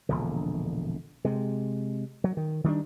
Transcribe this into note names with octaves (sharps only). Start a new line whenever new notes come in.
E1 A#1 D3
C3 G#3
F#3
D#3
D#3 G3 G#3 D4